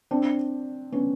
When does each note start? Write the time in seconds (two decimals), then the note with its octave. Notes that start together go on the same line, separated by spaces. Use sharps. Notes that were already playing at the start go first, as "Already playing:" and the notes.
0.11 C4 D4
0.92 B3 C#4